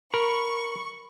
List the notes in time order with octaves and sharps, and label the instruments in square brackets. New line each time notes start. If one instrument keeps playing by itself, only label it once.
[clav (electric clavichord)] A#4 [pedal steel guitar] B5 [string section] C#6